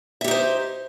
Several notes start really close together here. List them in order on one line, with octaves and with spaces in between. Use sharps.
E5 G4 D#4 C5